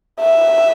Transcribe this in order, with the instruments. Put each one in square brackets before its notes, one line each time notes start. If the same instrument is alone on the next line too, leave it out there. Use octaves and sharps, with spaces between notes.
[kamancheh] E5